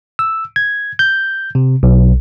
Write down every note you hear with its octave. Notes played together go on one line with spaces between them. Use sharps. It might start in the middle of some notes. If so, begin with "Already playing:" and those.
E6
G#6
G6
C3
B1